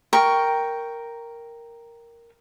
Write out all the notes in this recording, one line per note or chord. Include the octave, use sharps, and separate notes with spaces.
A#4 G5 C#6